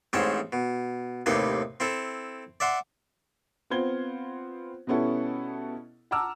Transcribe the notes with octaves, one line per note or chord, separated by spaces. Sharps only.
A1 G#2 C4 C#4 G5 A5
B2
D#2 A2 C3 D#4 B4 C6
C4 E4 A4
D5 E5 F#5 C6
B3 C4 F4 C5 G#6 G7
B2 G3 B3 C#4 E4 A4
F#5 A5 A#5 D6 E6 F6